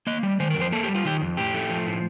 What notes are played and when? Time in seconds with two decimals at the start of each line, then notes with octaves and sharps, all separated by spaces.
0.07 A#3 D#5
0.23 G3
0.40 D#3 C5
0.50 A#4
0.56 F2
0.61 C5
0.72 A#3 A4
0.84 G3 G4
0.95 F4
1.05 D#3 G4
1.22 F2
1.37 A2 G4
1.54 A3
1.70 F3
1.87 A2